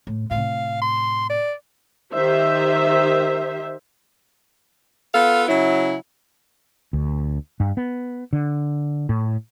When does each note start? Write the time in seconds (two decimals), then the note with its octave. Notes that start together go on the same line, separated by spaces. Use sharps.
0.07 A2
0.31 A2 C3 F5
0.81 C6
1.30 D5
2.13 D#3 G4 C5 E5
5.14 B3 F4 A4 F5
5.48 C#3 F#3 E4
6.93 D2
7.60 G2
7.77 B3
8.33 D3
9.09 A2